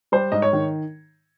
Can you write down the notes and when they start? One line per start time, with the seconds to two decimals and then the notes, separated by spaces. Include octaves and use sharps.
0.12 G3 C5
0.32 G#2 D#5
0.42 C#5
0.53 D#3